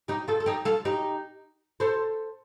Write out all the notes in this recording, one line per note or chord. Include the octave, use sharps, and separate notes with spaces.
D#4 G4
F4 A4
A4
D#4 G4
F4 A4
D#4 G4
A4 C5